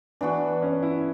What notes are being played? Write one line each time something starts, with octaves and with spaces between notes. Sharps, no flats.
E3 B3 D4 F#4
C#4
E4